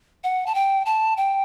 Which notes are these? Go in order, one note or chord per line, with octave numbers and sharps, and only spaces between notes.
F#5
A5
G5
A5
G5